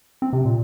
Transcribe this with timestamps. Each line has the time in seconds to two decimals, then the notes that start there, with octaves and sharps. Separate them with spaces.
0.22 C4
0.33 C3
0.45 A#2